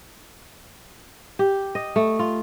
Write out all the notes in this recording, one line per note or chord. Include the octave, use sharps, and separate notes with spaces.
G4
D#5
A3
F4